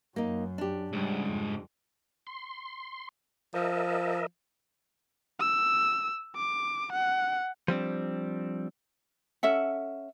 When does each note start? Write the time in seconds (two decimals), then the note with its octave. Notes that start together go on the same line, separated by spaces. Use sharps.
0.16 F#2 A#3 D#4
0.58 D4 G4
0.93 C#2 G#2 C#3 G3
1.26 F2
2.27 C6
3.54 F3 A#4 D#5 E5
5.40 E6
6.36 D6
6.93 F#5
7.68 F3 G3 C4 D4
9.43 C#4 A4 E5 F#5